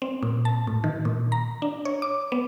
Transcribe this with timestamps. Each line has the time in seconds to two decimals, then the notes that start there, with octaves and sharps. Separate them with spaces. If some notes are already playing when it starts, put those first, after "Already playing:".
0.02 C4
0.23 A#2
0.45 A5
0.67 A2
0.84 D#3
1.05 A#2
1.32 A#5
1.62 D4
1.85 C#5
2.02 D6
2.32 B3